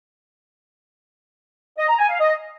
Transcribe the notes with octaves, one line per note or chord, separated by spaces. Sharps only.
D#5
A#5
G#5
F5
D#5